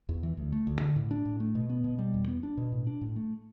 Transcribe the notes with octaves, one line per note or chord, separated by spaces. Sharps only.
E2
E3
D2
A3
D2
D3
A2
D4
A2
A3
B2
B3
B2
G3
E2
B3
D4
B2
A2
D4
A2
A3